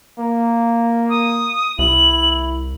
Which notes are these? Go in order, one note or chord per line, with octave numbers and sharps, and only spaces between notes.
A#3
D#6
C2 E4 F#7